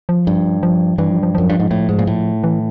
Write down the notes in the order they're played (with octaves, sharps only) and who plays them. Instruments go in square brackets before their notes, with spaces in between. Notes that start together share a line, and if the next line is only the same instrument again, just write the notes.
[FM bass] F3
[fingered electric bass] G2
[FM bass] F3
[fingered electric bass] G2 [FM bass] E3
[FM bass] F3
F3
[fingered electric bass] F#2 [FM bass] F3
[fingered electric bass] G2
G#2
A2
G#2
A#2
A2
[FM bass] E3